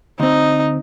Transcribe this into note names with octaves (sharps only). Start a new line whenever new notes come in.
D2 C4 D#4